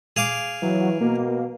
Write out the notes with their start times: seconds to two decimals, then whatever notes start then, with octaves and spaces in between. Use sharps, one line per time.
0.16 G#4 F5 D6
0.62 E3 F#3
1.01 B2 A#3